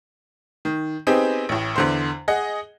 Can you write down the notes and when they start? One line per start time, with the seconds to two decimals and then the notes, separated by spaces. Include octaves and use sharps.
0.65 D#3
1.07 B3 C4 D#4 G4 G#4
1.49 A1 A2
1.76 E2 D3 C5
2.28 G#4 D#5 F#5